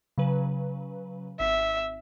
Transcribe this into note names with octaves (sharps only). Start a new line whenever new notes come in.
C#3 F#3 B4
G#1 E5 B6